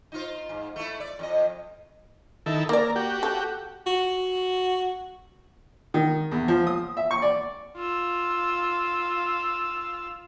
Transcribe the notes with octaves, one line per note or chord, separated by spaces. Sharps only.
D#4 F4 C5
G#2
A3 E4
D5
F2 D#5
D#3 E4 A4
A#3 A#4 D5
F#4 G4
A4
F#4
D#3
E2
F3
D#6
E5
C#6
D5
F4 E6